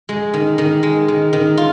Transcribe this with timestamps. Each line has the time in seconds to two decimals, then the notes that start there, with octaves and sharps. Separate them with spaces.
0.09 G#3
0.34 D#3
0.58 D#3
0.83 G#3
1.08 D#3
1.33 D#3
1.57 F4